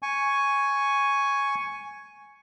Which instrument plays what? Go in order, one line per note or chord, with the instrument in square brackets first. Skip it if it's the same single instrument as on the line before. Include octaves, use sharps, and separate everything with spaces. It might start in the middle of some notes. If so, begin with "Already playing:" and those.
[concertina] G#5 C#6